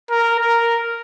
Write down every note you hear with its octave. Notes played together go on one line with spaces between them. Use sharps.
A#4
A#4